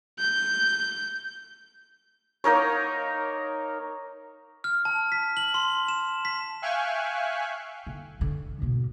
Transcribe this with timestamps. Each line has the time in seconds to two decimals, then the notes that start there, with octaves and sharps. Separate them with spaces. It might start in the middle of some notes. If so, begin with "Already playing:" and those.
0.19 G6
2.44 A#3 D#4 A#4 C#5
4.64 F6
4.85 A5
5.12 B6
5.37 F#7
5.54 C6
5.88 E7
6.25 B6
6.62 E5 F5 G5 G#5 C#6 F#6
7.87 D3
8.19 D3 G3
8.62 G#2 B2